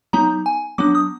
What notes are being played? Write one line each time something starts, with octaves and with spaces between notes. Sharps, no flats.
F#3 B3 D#4 A#5
G#5
F#3 B3 D4 D6
D#6